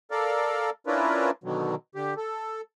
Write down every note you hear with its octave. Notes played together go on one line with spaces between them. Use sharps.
A4 A#4 D5 F5
C#4 D4 E4 F4 A#4 B4
B2 D3 D#3 F#3
D3 G4
A4